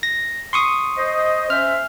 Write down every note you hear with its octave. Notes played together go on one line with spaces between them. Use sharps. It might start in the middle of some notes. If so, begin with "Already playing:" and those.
A#6
C6 C#6 D#6
C5 D#5
C#4 C5 E5 F6